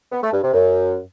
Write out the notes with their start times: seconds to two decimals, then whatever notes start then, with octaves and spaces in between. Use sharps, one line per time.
0.12 B3
0.22 A3
0.33 G2
0.43 C3
0.54 F#2